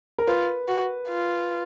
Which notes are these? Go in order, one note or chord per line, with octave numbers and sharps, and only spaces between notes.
A#4
F4 B4
F#4
F4